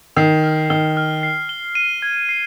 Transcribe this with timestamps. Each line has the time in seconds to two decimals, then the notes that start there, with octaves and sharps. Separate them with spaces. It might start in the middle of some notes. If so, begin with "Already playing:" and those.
0.17 D#3 C7
0.44 F6
0.70 D#3 G7
0.97 F6
1.23 C7
1.49 G7
1.75 D#7
2.02 G#6
2.29 C7